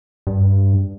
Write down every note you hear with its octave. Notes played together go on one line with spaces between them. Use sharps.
G2